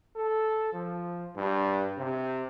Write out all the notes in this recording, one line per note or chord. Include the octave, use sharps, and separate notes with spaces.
A4
F3
G2
C3